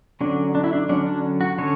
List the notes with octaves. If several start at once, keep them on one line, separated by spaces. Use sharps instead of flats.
D3 F#3 C#4 D4
D4
E4
D4
D3 F#3 C#4 D4
D4
F#4
D3 F#3 C#4 C#5